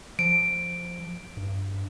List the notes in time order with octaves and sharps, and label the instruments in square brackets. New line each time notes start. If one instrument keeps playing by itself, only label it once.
[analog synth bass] F3 [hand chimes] D7
[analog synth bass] G2